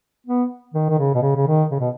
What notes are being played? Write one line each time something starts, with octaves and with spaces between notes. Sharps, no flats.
B3
D#3
D#3
C#3
B2
C#3
C#3
D#3
C#3
B2